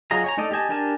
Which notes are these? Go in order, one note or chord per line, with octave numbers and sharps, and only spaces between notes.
F#3 F4 G#4 D#5 A#5
C#5 G#5 A#5
A3 D#4 A4 D5 D#5
G4 D#5 G#5 A5
D4 G4 A#4 G#5 A5